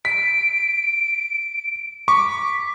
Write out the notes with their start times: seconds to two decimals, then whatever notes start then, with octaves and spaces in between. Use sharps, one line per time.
0.05 B6 D7
2.08 C#6 D6 B6